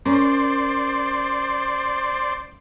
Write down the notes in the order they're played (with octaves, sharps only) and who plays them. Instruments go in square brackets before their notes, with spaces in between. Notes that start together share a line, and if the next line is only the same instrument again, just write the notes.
[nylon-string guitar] C#4 A#4 [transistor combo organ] C5 D5